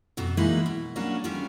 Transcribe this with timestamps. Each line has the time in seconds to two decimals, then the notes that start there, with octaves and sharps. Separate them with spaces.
0.17 F2 B2 F#3
0.37 E3 F#3 G#3 A#3 D#4 E4
0.66 B2
0.96 F#3 G3 A#3 C#4 D4 F#4
1.24 D3 D#3 F3 G3 C#4 D4